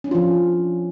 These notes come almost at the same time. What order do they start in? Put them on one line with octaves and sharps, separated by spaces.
C#4 D4 F4 F3